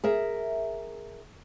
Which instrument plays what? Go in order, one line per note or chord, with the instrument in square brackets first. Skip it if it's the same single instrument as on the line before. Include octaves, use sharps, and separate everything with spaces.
[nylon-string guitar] G#4 A#4 E5